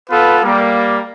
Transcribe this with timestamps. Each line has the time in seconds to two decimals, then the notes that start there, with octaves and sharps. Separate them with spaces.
0.10 B3 F4 A4 B4
0.43 G3 A#3